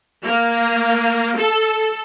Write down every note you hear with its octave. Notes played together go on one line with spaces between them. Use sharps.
A#3
A4